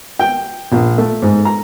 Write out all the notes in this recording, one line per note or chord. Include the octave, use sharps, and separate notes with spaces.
G5
A#1
A3
G#2
A#5